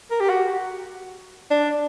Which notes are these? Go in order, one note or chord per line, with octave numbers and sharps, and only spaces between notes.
A#4
G4
F#4
D4